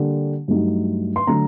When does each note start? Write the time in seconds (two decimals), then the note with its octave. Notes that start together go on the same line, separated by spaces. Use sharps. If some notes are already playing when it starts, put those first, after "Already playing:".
Already playing: D3 G3 A#3
0.48 G2 F#3 A3 D#4
1.16 C6
1.27 D3 F#3 A3 A#5